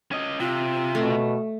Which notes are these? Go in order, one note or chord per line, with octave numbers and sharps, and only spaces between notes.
C#4 D#5
C3 F4
B2 A3